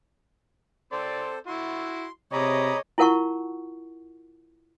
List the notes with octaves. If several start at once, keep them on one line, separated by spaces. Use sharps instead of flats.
C4 A4 C5 D5 C6
E4 F#4 C6
C3 G#4 C#5 D#5 A#5 B5 D6 D#6
E4 F4 A#4 F#5 A5 C#6